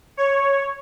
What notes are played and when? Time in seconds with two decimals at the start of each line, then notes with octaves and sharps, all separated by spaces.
0.17 C#5